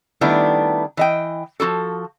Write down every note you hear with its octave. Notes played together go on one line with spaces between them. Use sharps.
D#3 G3 A3 B3 D4 E4
E3 D#5 G5
F3 F4 F#4 A4